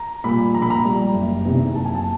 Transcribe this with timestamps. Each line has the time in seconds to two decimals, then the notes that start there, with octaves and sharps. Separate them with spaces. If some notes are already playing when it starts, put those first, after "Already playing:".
Already playing: A#5
0.24 A#2 G3 B5
0.54 A#1 A#5
0.62 B5
0.70 A#5
0.84 A#2 G3
1.14 F#1
1.45 E2 C3 D#3
1.75 F#1 A5
1.85 G#5
1.95 A5